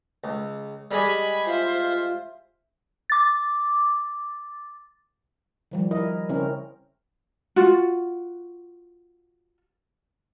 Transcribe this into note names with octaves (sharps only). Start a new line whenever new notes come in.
C#2
G3 G#3 G4 G#5 B5
F4 C5 E5
D6 A6
D#3 F3 G3
E4 A#4 D#5
C#3 C4 C#4 E4 A#4
F4 F#4